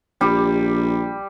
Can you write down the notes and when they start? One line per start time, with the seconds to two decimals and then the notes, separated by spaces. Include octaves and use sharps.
0.21 A#1 G3 G4